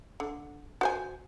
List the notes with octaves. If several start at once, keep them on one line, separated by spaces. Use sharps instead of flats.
D3
F#4 C5 G#5